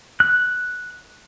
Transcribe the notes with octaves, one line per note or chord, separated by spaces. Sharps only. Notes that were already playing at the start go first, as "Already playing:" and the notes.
F#6